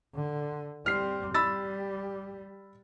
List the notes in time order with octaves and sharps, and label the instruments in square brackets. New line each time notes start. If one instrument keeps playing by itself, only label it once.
[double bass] D3
[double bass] G3 C4 [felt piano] F6 C7
[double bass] G3 [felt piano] B5 E6 A6